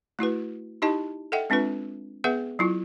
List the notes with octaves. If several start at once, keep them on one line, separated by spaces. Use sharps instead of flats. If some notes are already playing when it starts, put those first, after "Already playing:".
A3 E4 F#4 B4
D#4 E4 G4 D#5 A5
A4 D#5 E5 F#5 G5
G#3 C4 D4 F4 B4
B3 G#4 B4 E5 F#5
F#3 E4 F4